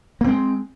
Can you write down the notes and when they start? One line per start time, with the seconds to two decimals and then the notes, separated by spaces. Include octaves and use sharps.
0.21 A#3
0.24 C4
0.28 G#3